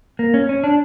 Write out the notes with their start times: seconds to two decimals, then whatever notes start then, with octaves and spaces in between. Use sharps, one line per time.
0.19 A#3
0.34 C#4
0.49 C#4
0.64 D4